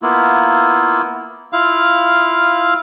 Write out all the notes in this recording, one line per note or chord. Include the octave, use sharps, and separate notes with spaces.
A#3 B3 E4 F4
E4 F4 F5